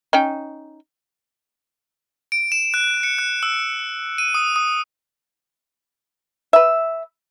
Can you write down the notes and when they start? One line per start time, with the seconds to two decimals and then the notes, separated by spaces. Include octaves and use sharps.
0.13 C#4 D#4 G5
2.32 D7
2.52 E7
2.74 F#6
3.03 C#7
3.18 F#6
3.43 E6
4.18 D#7
4.35 D#6
4.56 D#6
6.53 B4 E5